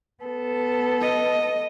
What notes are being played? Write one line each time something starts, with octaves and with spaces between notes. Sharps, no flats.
B3 A4
D#5